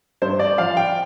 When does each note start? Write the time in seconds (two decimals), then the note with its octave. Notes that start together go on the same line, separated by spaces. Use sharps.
0.22 G2 C5
0.39 D5
0.58 F3 F5
0.77 G5